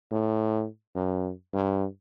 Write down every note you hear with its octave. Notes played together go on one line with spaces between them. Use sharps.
A2
F#2
G2